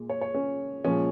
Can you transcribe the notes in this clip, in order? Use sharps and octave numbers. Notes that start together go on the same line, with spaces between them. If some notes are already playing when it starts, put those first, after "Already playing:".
Already playing: A#2 G#3
C#5
C#5
C#4
A#2 F3 G#3 C#4